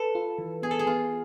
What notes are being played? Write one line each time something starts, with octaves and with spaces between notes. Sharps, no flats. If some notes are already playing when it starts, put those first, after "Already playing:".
Already playing: A4 B4
F4
E3
B3 G#4
A4
G#4
B3 F4